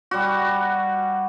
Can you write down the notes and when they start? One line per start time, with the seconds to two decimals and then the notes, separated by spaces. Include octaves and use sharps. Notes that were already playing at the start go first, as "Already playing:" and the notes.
0.11 G3 F#4